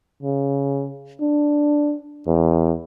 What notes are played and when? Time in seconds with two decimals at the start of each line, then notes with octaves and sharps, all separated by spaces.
0.23 C#3
1.20 D4
2.27 E2